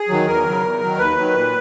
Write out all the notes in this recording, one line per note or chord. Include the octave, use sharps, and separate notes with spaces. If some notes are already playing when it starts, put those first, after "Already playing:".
Already playing: G#4
D#3 F#3
E2 A#4
C#3 F#3
E2
D#3 F#3
D#2 B4
D#3 F#3
A#2